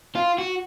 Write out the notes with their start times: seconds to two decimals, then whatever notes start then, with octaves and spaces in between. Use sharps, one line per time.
0.15 F4
0.38 F#4